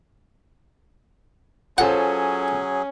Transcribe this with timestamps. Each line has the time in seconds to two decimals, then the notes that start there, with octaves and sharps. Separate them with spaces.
1.78 F#3 C#4 F4 G#4 A4 C5 F#5